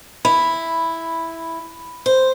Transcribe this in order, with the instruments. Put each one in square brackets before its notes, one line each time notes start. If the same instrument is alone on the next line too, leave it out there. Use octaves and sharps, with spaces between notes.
[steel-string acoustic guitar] E4 [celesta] B5
[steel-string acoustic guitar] C5